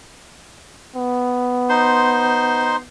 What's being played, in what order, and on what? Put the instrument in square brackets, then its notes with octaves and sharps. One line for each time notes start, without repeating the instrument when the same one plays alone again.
[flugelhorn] B3
[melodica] D#4 C5 C6